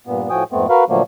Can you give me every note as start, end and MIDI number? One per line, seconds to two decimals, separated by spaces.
0.07 0.30 43
0.07 0.30 46
0.07 0.30 59
0.30 0.44 45
0.30 0.44 53
0.30 0.44 66
0.30 0.44 79
0.30 0.44 80
0.30 0.44 87
0.52 0.67 41
0.52 0.67 44
0.52 0.67 57
0.52 0.67 59
0.52 0.67 60
0.70 0.84 66
0.70 0.84 70
0.70 0.84 71
0.70 0.84 77
0.89 1.02 46
0.89 1.02 50
0.89 1.02 53
0.89 1.02 54
0.89 1.02 57
0.89 1.02 58